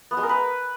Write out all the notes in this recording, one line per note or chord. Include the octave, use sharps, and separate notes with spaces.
B3
G#3
A#4
B4